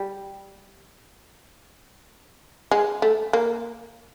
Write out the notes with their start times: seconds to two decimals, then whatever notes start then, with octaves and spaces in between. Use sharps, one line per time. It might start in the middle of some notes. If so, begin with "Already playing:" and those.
Already playing: G3
2.71 G#3
3.02 A3
3.33 A#3